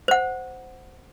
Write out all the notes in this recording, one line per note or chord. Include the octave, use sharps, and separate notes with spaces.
C5 F#5